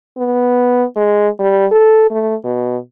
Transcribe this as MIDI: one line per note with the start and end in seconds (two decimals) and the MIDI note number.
0.17 0.83 59
0.96 1.28 56
1.39 1.66 55
1.71 2.07 69
2.11 2.35 57
2.44 2.77 47